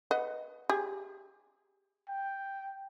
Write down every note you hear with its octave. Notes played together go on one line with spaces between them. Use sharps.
B4 D#5 F#5
G4 G#4
G5